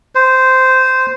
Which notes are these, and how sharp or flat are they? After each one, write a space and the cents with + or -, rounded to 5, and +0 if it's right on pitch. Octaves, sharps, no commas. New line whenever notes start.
C5 -10